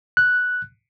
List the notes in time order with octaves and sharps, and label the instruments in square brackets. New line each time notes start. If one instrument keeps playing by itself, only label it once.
[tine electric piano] F#6